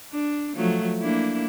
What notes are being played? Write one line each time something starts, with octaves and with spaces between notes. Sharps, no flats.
D4
F3 F#3 A3
A#3 D4 E4